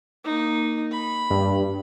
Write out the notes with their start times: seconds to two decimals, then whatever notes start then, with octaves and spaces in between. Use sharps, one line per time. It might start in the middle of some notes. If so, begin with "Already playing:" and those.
0.24 A#3 D#4
0.92 B5
1.30 G2